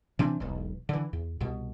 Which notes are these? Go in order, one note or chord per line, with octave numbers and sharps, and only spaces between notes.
C3 E3 C4 D4
E1 B1
D3 E3
E2
C2 B2